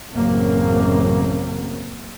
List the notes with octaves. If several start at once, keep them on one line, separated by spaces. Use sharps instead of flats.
A1 F#2 C#3 A#3 C4